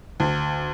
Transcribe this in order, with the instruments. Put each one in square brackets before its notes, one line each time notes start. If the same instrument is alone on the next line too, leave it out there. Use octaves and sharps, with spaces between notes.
[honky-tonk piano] D2